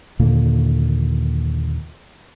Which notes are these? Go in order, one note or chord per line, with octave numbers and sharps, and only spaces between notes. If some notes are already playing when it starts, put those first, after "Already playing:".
D#2 A#2 D3 A#3